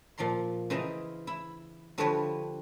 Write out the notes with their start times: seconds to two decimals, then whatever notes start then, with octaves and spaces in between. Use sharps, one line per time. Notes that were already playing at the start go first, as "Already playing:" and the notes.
0.18 A#2 F3 D5 A#5 C6
0.70 C#3 E3 C5 D#5 A#5
1.27 E4
1.98 D3 F3 G3 F#4 B4 C#5